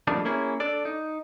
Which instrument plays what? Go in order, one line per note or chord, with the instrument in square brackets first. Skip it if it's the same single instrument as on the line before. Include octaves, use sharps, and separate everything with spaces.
[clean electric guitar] F3 G3 A3 A#3 D4 D#4
A#3 C#4 E4 G#4
D4 A4 D5
D#4